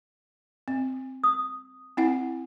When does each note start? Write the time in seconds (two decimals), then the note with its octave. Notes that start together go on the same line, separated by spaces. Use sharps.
0.68 C4
1.24 D#6
1.97 C4 E4 F#5